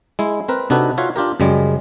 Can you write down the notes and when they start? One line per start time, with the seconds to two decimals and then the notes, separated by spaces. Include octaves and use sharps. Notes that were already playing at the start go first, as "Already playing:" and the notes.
0.19 G#3 E4
0.48 C4 A#4 B4
0.70 C3 D4 D#4 F#4 A4 B4
0.98 F4 F#4 C#5 E5 F5
1.16 D4 F4 G4 A#4
1.40 F#2 C#3 G3 G#3